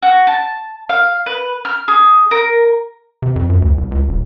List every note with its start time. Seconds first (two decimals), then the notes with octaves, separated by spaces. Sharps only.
0.02 F#4
0.27 A5
0.89 F5
1.26 B4
1.65 F6
1.88 G#4
2.31 A#4
3.22 C3
3.36 F2
3.50 F#2
3.62 D2
3.78 C2
3.91 C#2
4.09 D#1